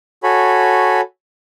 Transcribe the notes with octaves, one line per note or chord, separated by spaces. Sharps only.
F#4 A4 C#5 G#5 B5